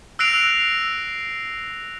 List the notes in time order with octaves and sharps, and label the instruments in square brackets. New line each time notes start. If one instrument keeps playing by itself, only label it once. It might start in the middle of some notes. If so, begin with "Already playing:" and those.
[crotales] E6 F#6 A#6 C7 D7 F7